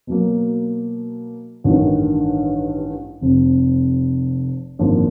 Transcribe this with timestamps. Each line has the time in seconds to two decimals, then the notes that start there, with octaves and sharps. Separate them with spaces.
0.07 B2 F#3 A#3
1.64 A1 G2 D#3
3.21 F1 F2 C3
4.79 G#1 F#2 D3 F3 A#3